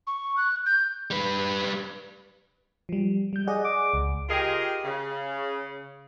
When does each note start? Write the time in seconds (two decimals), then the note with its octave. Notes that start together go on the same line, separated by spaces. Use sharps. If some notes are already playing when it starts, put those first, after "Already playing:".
0.07 C#6
0.37 F#6
0.66 G6
1.11 G3 B4
2.89 F3 G3
3.33 G3 G6
3.47 G#4 D5 D#5 F#5
3.64 D6
3.94 C#2
4.29 F4 G4 G#4 A#4 D#5
4.84 C#3